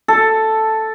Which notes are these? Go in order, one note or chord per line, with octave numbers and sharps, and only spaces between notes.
A4